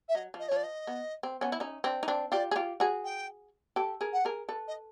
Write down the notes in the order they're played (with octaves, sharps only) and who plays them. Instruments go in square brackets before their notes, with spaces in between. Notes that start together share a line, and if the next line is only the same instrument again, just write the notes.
[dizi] E5
[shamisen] F#3 [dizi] D#5
[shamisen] F3
[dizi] D#5
C#5
[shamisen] F3 [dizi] D5
[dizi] D#5
[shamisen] B3
C4
B3 C#4
E4
C#4 D#4
C4 D4
D#4
C4 D4
[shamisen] F4 G4 [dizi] D5
[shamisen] G#4
F4 G4
F#4 G#4
[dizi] G5
[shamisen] G4 A4
G#4 A#4
[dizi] F#5
[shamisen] G#4 A#4
A4 B4
[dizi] D#5